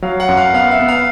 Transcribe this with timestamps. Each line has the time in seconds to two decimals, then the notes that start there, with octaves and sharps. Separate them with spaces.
0.02 F#3 F5
0.20 F#5
0.29 F#2
0.37 F5
0.54 B3 F5
0.71 E5
0.80 B3
0.88 F5